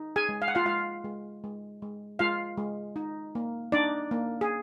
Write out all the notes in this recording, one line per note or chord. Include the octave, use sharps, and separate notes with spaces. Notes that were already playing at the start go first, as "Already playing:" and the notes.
Already playing: D#4
G#4 G#5
G#3
F5
F#5
F4 F5
G#3 F4 F5
G#3
G#3
G#3
G#3 F4 F5
G#3
D#4
A#3
D4 D#4 D5
A#3
G#4